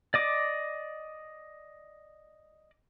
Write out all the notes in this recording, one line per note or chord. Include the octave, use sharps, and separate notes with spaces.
D5 D#5 D6